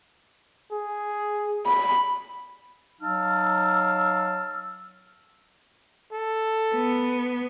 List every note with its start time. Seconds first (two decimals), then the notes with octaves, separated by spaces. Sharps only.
0.72 G#4
1.66 B5
3.02 F#3 D#4 F5 A5 E6 F6
6.13 A4
6.74 B3